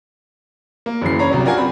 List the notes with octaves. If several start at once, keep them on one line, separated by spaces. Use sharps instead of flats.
A#3
F#1 C#3 E3 C7
C#4 D4 C#5 A#5 B5
C2 F#3
D4 F4 F#4 A#4 D5 G#5
C4 B5